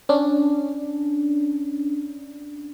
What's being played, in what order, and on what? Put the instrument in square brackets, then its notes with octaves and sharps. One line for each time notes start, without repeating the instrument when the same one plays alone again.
[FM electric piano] C#4 D4